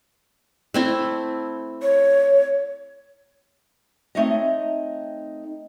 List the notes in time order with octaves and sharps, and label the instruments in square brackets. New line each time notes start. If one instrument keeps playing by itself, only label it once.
[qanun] A3 C4 E4
[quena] C#5
[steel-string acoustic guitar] A3 C4 D#4 C#5 D#5